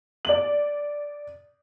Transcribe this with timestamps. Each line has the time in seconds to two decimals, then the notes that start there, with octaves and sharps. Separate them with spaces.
0.25 D5 F#7